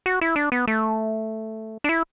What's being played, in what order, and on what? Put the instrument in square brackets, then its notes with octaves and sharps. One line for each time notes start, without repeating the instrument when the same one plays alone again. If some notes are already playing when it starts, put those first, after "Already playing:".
[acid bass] F#4
E4
D4
B3
A3
D4
E4